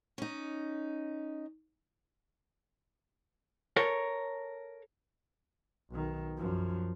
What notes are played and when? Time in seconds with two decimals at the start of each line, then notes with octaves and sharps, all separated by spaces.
0.18 C#4 D#4
3.76 A4 A#4 C#5
5.90 B1 D#3
6.37 F#2 F3